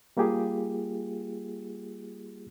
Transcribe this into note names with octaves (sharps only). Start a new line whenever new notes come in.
G3 A#3 F4 G4 G#4